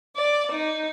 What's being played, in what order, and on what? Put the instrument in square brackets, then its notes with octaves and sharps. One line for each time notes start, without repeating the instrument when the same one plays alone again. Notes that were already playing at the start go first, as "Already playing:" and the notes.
[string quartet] D5
D#4